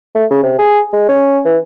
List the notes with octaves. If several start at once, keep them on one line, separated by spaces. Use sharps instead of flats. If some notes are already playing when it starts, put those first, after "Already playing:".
A3
C#3
C3
G#4
G#3
C#4
E3